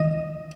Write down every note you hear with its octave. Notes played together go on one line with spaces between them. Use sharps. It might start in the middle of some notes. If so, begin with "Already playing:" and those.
Already playing: D#5